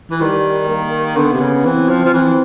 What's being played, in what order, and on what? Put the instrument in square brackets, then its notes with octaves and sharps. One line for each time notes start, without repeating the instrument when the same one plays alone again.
[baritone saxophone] E3
[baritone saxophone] D#3 [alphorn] G3
[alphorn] A#3
[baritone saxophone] D3 [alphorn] B3
[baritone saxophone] C3
C#3
[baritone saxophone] E3 [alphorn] C4
[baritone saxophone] F3
F3
[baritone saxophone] E3 [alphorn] C4